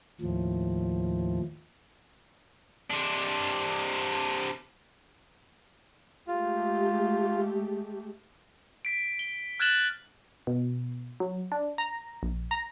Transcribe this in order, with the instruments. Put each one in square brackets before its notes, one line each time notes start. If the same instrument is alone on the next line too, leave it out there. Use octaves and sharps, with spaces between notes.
[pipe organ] D#2 A2 F3
[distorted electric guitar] C3 D4
[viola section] G#3 A3 G4 [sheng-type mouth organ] F4
[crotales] B6 D7
G7
F6 F#6 G#6 A6 E7 F#7
[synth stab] B2
F#3
D4
A#5
A#1
A#5